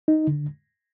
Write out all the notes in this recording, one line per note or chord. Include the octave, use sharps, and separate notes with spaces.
D#4
D3